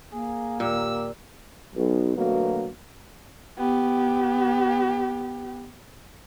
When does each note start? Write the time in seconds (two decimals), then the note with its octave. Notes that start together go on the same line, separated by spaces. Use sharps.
0.12 A#3 G#4
0.60 D#2 A#2 G4 A#4 E6
1.75 B1
2.15 D2 B2 F#3 A#3 B3
3.58 B3 G4